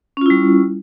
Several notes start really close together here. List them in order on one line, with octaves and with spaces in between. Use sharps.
C#4 F4 E4 G3